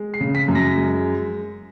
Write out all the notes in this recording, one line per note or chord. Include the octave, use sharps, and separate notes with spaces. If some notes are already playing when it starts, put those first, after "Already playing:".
Already playing: G#3
C7
C#3
B6
F#2
A#6
G#3